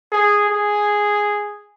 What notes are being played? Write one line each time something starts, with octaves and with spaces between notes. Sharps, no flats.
G#4
G#4